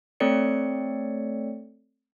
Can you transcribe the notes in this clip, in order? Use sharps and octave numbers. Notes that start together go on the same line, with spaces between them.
A3 C4 A4 C#5 D5 C#7